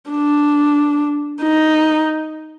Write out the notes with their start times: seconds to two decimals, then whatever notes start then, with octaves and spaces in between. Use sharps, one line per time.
0.11 D4
1.42 D#4